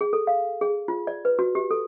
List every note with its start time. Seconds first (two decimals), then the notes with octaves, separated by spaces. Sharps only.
0.01 G#4
0.13 A4
0.27 F5
0.61 G#4
0.88 F4
1.07 D5
1.25 B4
1.39 F#4
1.55 G4
1.71 A4